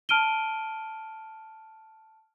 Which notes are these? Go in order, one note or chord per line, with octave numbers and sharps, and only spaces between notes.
A5 F6 D7 D#7 G7